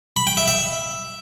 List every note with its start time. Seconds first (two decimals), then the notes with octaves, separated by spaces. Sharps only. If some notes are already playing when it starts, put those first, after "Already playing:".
0.16 B5
0.27 G5
0.37 E5
0.48 E5